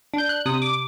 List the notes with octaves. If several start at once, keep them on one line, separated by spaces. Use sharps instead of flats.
D4 G6
F#6
C3 D#6
D6